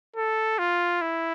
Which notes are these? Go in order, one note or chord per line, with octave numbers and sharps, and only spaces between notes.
A4
F4
E4